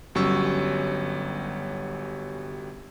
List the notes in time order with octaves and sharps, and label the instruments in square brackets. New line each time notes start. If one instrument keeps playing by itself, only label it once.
[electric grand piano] G1 F#3 G3 C#4 C#6 E6